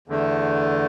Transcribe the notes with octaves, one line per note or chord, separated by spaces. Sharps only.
E2 D3 A3